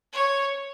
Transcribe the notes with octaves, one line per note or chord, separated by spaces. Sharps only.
C#5